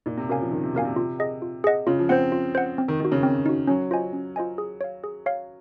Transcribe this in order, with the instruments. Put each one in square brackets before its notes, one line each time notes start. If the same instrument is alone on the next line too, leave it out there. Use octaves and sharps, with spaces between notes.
[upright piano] A#2 [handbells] D#4
[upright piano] C3
[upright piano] C#3 [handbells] F#4 A#4 F5 G#5
[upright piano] F3
[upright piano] D#3 [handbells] D#4
[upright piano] C3
[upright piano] A#2 [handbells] F#4 A#4 F5 G#5
[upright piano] C3
[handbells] F4
G#4 D#5 F#5
F4
G#4 D#5 F#5
[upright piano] C#3 [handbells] F4
[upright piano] F3
[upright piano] C4 [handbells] C5 F#5
[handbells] F4
C5 F#5
C4
[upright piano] D#3
[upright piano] D#3 [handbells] D#4 F#4
[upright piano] C#3
[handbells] C4
D#4 F#4
[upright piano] F#3 [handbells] C#4
[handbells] F4 C5 D#5 G#5
C#4
F4 C5 D#5 G#5
G#4
C#5 F5
G#4
C#5 F5